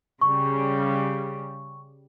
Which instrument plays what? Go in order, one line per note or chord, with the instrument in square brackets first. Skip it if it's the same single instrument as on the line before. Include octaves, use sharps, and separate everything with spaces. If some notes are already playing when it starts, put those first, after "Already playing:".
[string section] C#3 G3 [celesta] C#6